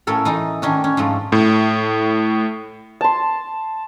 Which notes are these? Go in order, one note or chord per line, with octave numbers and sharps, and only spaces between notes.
A2 C#4 A4 A#4
E3 D#4 A4
D#3 C#4 D4
C#4
G#2 F3 A3 A4
A2
A5 C6